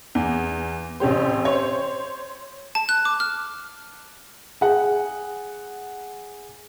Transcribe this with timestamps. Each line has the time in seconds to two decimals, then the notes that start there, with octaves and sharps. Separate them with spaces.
0.15 E2
1.00 A1 C3 C#4 G4 C5
1.45 C5 C#5
2.75 A5
2.89 F#6
3.05 D6
3.20 F6
4.61 G#4 F#5